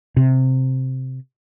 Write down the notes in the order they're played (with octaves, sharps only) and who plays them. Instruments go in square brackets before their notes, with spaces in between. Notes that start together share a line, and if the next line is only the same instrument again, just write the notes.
[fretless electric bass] C3